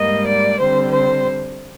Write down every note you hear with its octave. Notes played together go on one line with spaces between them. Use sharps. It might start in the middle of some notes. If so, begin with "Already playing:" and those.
Already playing: G#2 G3 A#3 D#5
D5
D3 G3 C4 C5
C5